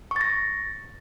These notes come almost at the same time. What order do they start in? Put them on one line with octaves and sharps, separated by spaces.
C#6 A6 A#6